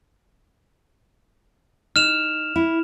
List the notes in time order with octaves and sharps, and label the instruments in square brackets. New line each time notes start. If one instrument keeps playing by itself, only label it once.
[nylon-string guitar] D#4 [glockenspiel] F6 E7 F7
[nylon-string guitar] E4